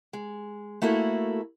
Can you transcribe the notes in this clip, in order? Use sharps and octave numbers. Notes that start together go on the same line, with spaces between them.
G#3
A3 A#3 E4 F#4 A4